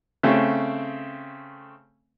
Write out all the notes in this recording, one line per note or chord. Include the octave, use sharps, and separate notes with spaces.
C#3 A3 C4